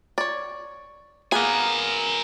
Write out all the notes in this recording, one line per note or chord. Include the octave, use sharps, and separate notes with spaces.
C#5 D5
A#3 B3 G#4 A#4 G#5